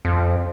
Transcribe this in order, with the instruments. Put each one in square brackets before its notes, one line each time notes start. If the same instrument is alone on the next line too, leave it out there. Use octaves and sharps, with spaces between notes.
[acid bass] F2